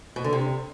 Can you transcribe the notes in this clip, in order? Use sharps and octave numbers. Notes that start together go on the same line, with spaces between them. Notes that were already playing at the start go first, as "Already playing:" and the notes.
B2
D3
C3